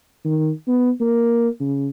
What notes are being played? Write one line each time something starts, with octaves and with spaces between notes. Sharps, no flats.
D#3
B3
A#3
C#3